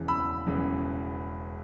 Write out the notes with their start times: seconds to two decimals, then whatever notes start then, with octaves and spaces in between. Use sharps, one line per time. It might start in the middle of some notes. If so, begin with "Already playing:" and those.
Already playing: E1 E2 C#3 E3
0.08 B5 E6
0.47 E1 E2 C#3 E3